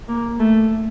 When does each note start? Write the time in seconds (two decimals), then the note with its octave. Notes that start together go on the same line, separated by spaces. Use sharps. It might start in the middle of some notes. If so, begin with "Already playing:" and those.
0.09 A#3
0.40 A3